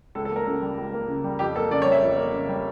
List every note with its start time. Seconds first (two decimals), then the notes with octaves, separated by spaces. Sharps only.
0.15 C#2 A4
0.25 A4
0.31 A#3 A#4
0.46 C#3 A4
0.62 G3
0.77 C#2
0.93 A#3
1.08 C#3
1.24 G3
1.39 F2 G4
1.56 A#3 A4
1.71 C#3 D5
1.82 C#5
1.86 G3
1.92 E5
2.02 F2
2.17 A#3
2.33 C#3
2.48 G3